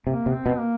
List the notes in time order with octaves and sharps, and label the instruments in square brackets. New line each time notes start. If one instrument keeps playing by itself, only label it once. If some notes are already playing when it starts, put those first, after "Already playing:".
[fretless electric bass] C3 [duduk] A#3
[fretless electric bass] C3
[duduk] C4
[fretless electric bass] B2
[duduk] A#3